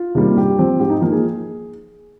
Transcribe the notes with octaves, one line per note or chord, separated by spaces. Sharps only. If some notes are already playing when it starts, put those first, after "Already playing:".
Already playing: F4
C3 D#3 G3 A#3
G2 G4
F3 C4
G#2 G4
D#4
F3 A#3 D#4
G#4